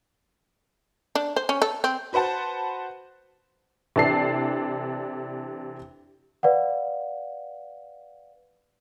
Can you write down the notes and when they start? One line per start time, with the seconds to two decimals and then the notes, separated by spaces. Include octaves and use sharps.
1.15 D4
1.36 C5
1.49 C#4
1.62 A4
1.84 C4
2.13 F#4 B4 C5 F#5 A5
3.96 C3 E3 D4 A4 C7
6.43 B4 D5 F5 F#5